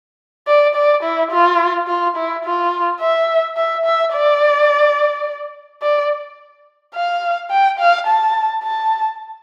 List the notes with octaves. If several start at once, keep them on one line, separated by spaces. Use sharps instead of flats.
D5
D5
E4
F4
F4
E4
F4
E5
E5
E5
D5
D5
F5
G5
F5
A5
A5